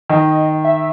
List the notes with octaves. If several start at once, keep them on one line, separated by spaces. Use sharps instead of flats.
D#3 D#5
E5